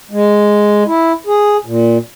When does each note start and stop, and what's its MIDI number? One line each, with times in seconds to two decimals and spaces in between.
0.11 0.84 56
0.87 1.12 64
1.27 1.57 68
1.65 1.98 46